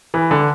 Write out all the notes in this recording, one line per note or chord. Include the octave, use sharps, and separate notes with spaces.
E3
D3